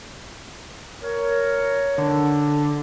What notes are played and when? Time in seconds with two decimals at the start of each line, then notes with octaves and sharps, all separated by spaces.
1.02 A#4 C#5
1.98 D3